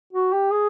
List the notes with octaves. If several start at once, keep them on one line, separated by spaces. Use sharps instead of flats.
F#4
G4
G#4